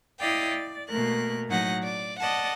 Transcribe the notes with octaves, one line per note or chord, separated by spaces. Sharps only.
E4 D5 D#5 F5 G5
D5
B2 A3 A#3 A#4 F#6
A2 F#3 D#4 F#5 A#6
D5
D5 D#5 F#5 A5